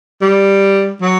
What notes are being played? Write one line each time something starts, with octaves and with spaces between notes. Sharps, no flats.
G3
F#3